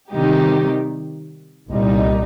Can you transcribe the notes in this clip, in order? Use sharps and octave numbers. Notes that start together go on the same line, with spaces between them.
C3 D#3 G3 D#4 G4
C2 A#2 G3 D#4